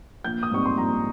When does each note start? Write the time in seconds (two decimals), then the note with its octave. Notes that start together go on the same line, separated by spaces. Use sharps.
0.24 A#1 G6
0.43 D#6
0.51 G#2 G3 C4 D#4 C#6
0.66 C6
0.77 A#1 A#5